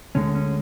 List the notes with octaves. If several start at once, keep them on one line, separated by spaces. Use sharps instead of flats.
D2 D3 G#3 C#4
C#4